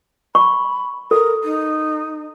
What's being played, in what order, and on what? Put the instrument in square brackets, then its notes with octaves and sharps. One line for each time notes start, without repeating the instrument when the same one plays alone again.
[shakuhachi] B5 [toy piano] C#6
[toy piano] A4 [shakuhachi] A#4
[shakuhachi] D#4